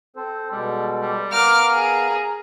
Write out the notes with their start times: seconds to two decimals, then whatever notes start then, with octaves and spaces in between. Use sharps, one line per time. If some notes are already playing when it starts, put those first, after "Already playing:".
0.16 C4 A4 C5
0.52 B2 G3 G#3 A4
1.02 G3
1.32 B3 A#4 F5 D6 F6
1.72 G#4